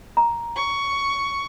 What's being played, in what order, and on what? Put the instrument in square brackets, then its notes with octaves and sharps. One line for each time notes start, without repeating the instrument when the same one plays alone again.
[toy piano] A#5
[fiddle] C#6